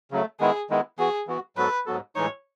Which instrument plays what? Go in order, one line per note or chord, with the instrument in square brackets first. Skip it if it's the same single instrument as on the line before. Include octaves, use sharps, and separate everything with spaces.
[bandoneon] C#3 F#3 A3
[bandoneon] D#3 G#3 B3 E4 [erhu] G#4
[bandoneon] D#3 G#3 B3 E4
[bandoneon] E3 B3 F#4 [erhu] G#4
[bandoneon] E3 B3 F#4
[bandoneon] G#2 F#3 B3 F#4 A4 [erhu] B4
[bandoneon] G#2 F#3 B3 F#4 A4
[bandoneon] A2 E3 G#3 D#4 [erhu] C#5